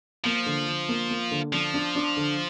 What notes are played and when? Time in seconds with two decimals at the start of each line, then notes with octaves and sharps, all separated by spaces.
0.24 F3 A#3
0.46 D3
0.68 D3
0.89 A#3
1.10 A#3
1.31 D3
1.53 F3 D4
1.74 D4
1.95 D4
2.17 D3